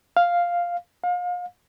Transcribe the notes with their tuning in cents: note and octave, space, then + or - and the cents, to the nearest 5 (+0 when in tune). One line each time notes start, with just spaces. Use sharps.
F5 +0
F5 +35